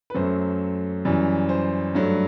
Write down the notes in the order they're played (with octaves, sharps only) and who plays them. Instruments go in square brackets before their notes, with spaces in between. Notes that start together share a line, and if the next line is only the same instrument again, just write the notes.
[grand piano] B4
F#2 F#3 A3 C5
F#2 E3 G3
C5
G2 F#3 A3